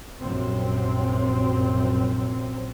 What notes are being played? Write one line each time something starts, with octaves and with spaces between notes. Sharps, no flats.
A#1 F#2 C3 C4